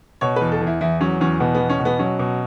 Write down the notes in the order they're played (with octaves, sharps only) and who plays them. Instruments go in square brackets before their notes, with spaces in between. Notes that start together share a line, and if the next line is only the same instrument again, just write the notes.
[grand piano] B2 [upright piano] C#5
[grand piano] E2 [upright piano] B4
[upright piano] A4
[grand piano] E2
[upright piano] E4
[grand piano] E2 [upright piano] E4
[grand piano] F#3 [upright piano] C#4
[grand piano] E2 [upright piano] C#4
[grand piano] B2 [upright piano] B3
[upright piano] B3
[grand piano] E2
[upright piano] C#4
[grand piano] B2
[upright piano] B3
[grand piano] F#3 [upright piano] C#4
[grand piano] B2